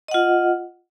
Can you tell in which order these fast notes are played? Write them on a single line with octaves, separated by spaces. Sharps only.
D#5 F#5 F4